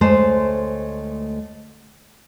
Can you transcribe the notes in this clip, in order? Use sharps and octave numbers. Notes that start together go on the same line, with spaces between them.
D2 G#3 A3 C5 C#5 A5